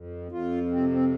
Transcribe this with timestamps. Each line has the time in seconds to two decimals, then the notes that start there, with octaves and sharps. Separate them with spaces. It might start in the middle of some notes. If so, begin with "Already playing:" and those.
Already playing: F2
0.32 F2 F4
0.71 C3 C4
0.91 C4